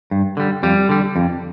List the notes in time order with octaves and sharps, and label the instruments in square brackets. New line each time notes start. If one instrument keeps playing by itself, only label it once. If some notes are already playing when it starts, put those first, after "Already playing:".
[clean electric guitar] G2
D3 G3
F2 G3
D3 G3
F2